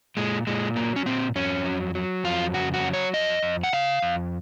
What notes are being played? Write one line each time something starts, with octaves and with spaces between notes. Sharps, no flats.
A#2 G#3
A#2 G#3
F#3 A#3
C#4
A#2 C4
F2 C#4
F#3
F#3
F2 F4
C#3 F#4
F#4
F#3
C#5
F2 D#5
F2
F#5
C#3 F5
F2